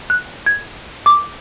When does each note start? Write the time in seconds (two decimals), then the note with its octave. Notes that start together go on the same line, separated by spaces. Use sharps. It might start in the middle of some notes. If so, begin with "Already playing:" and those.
0.10 F#6
0.46 G#6
1.06 D6